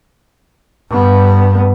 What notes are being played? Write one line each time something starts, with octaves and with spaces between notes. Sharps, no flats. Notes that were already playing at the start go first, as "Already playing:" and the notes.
G2 B3